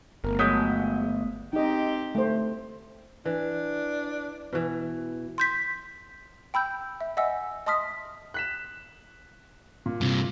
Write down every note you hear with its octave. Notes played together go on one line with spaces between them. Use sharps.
G1 A3 B3 A#4
F#3 G#3 D#6 G6 B6
C4 D#4 G4 D#5
A3 C5
E3 D4
B2 E3
C6 G6 B6
G5 B5 E6 G6
E5
D#5 E5 F#5 G#5 E6
D#5 A5 C6 D#6 F6 B6
F#6 B6 E7
A#2
G2 C3